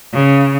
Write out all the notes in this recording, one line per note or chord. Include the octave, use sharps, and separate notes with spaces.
C#3